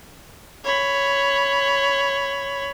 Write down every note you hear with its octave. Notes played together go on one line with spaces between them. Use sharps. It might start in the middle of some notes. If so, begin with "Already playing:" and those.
C#5 B5